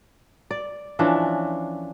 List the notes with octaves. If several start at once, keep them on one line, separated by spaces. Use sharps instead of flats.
D5
E3 F3 C#4 D4